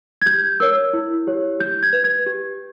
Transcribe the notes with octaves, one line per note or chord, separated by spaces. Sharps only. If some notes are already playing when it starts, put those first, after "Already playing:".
G#6
G4 G6
A#4 C#5 E6
E4
G4 C#5
G4 G6
G#6
B4
G#6
G4